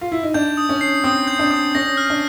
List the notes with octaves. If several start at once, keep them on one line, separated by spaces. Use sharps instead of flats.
F4
E4
D#4
D4 G6
D#6
C#4
C7
C4 D#6
G6
D4
D#6
C#4 A#6
F6
D4